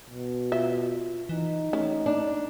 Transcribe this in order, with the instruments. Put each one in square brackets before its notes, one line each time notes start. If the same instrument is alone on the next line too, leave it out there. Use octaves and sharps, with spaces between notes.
[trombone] B2
[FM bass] F4 [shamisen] E5
[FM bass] E3 [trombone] D#4
[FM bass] A3 [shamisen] C#4
[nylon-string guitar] D4